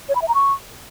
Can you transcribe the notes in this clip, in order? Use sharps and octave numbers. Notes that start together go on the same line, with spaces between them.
C#5
B5
E5
A#5
C#6